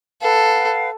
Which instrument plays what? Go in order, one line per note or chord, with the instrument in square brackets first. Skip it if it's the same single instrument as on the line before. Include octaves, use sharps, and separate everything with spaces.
[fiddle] A4 [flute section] B4 F5 F#5